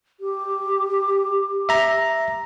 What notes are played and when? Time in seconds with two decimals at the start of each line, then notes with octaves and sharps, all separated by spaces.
0.20 G4
1.69 E5 A#5